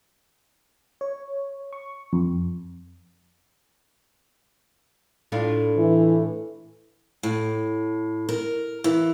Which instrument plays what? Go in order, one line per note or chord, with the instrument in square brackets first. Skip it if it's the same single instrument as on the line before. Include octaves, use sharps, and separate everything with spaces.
[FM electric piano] C#5
C#6
F2
[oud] A2 D4 F4
[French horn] E3
[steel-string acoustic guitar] A2
A#4
E3